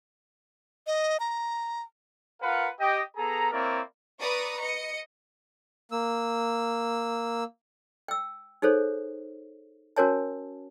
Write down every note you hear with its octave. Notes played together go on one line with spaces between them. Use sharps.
D#5
A#5
F4 A#4 B4 F5 F#5
G4 D#5 G5
B3 G#4 A4 A#5
A#3 C4 E4 A#4 C#5 D5
B4 D5 A#5 C#6 D#6
D#5 C#7
A#3 E6
G5 E6
D#4 G#4 A4 C5 C#5
C#4 F#4 A#4 C#5 G#5 A5